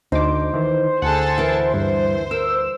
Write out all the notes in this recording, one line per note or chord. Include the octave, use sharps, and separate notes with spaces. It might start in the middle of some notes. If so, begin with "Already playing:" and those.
D2 D#4 C5 D6
D#3 E3
D2 G#4 A4 F#5 A5
E3 A#4
G2 C5
A#4 E6